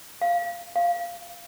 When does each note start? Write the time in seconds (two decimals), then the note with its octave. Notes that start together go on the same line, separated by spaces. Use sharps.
0.21 F5
0.76 F5